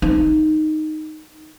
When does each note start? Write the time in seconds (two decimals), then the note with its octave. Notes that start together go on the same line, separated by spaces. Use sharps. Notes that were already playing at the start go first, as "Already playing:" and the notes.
0.02 D#4